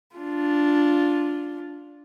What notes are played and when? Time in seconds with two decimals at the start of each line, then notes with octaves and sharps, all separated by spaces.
0.16 D4 F4